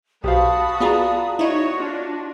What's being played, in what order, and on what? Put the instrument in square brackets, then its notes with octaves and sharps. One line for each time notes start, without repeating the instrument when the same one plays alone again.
[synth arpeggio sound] B1 [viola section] F#4 A5 B5 [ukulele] G4 C5 F5 [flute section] D#6
[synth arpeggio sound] B3 F4 G#4 [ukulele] D5 F5 A#5
[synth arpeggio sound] D#4 E4 [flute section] F#4 [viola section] C#5
[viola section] D4 [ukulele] F4